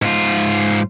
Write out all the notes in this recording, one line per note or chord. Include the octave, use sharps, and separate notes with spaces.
G#2 F4